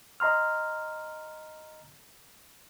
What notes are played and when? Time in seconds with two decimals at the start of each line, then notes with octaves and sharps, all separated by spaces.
0.20 D#5 A#5 C6 F6